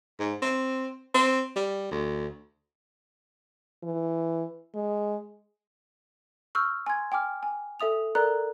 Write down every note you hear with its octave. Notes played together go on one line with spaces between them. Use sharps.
G#2
C4
C4
G3
D2
E3
G#3
C#6 E6 F6 G6
G#5 C6 G#6
G5 G#5 D6 F6
G#5
A4 E5 D#6 F7
A4 A#4 D5 A#5 F#6